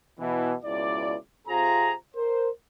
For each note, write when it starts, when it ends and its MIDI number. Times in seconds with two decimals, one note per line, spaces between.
0.19 0.54 47
0.19 0.54 52
0.65 1.15 37
0.65 1.15 47
0.65 1.15 64
0.65 1.15 74
1.47 1.94 48
1.47 1.94 60
1.47 1.94 65
1.47 1.94 68
1.47 1.94 82
2.15 2.48 70
2.15 2.48 72